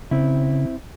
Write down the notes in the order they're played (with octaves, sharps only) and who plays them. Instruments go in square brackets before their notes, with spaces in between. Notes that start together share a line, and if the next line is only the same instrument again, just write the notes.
[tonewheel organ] C#3 [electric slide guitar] C4 E4